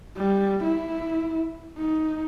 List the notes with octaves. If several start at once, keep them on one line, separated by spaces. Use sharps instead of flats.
G3
E4
D#4